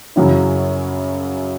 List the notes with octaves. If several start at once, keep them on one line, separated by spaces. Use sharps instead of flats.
F#2 C#3 F#3 C#4 E4